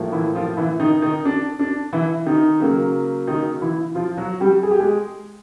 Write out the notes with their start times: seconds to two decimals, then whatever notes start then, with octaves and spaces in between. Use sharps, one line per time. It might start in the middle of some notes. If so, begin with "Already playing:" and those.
Already playing: A2 F3 A#3
0.12 E3 E4
0.35 F3 F4
0.57 E3 E4
0.80 D#3 D#4
1.02 D#3 D#4
1.25 D4
1.59 D4
1.93 E3 E4
2.26 D#3 D#4
2.60 C#3 F#3 A#3
3.27 D#3 D#4
3.61 E3 E4
3.95 F3 F4
4.17 F#3 F#4
4.40 G3 G4
4.63 G#4
4.71 G4
4.80 G#3 G#4